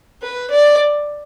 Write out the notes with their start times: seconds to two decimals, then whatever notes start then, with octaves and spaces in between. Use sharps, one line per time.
0.22 B4
0.51 D5